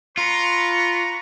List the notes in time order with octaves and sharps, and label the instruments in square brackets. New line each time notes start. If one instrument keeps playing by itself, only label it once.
[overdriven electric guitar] F4 [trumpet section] B4 A#5 C#6